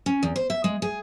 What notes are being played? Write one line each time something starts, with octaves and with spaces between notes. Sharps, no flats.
C#4
E2
C5
E5
G#3
G#4